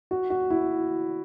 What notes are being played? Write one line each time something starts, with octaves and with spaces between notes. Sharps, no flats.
F#4
F#4
E4